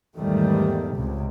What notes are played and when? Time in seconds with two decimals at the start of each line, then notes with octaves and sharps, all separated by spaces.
0.16 E2 G#2 D#3 G3 A3
0.95 C#2 C3